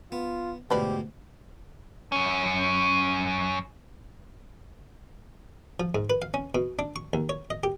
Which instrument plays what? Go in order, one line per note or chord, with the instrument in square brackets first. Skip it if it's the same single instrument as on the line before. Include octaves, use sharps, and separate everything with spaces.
[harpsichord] B3 [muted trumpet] F4
[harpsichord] D2 G#2 B2 [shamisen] F3 B4 D5 [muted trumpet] G4
[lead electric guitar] F#2 C#4
[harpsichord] F3
G#2
B4
F5
C#4
B2
D4
C#6
D#2
C#5
D#5
G4